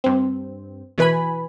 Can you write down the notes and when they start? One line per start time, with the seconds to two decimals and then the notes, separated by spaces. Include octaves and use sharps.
0.04 G2 C4
0.98 B2 E3 B4 G#5 B5